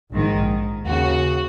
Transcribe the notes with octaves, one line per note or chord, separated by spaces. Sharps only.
A#1 G#2 D#3
D#2 C#3 F#4